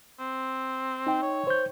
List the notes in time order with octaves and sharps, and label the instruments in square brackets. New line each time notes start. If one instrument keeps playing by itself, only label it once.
[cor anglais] C4
[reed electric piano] D#4 G5
[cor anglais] C#5
[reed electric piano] C5 G6